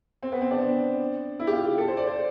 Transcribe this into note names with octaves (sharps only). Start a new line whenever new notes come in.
C4
B3
C4
D4
E4
G4
F4
G4
A4
C5
D5
C5